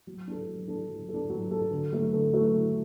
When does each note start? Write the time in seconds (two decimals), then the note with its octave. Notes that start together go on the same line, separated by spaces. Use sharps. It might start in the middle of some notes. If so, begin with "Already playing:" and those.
0.07 F#3
0.28 D4 A4
0.48 F#3
0.68 D4 A4
0.89 F#3
1.09 A4
1.14 D4
1.30 F#3
1.51 D4 A4
1.71 D3
1.92 F#3 A3 F#4
2.13 D3
2.33 F#3 A3 F#4
2.53 D3